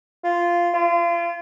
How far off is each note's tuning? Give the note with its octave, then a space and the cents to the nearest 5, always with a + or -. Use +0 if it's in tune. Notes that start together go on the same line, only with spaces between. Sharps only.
F4 -10
F4 -35